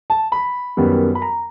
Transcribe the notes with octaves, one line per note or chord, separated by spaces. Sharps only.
A5
B5
F#2 D#3 G3 B3
B5
A#5